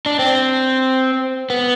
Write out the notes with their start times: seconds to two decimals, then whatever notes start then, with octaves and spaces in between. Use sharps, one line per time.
0.06 D4
0.19 C4
1.50 B3